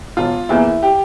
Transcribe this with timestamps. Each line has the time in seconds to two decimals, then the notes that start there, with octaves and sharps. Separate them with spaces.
0.17 E1 F4
0.49 E2 E3 A#3 E4
0.83 G4